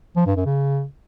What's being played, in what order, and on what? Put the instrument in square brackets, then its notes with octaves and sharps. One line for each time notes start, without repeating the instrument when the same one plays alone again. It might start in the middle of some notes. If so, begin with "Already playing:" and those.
[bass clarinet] F3
G2
F#2
C#3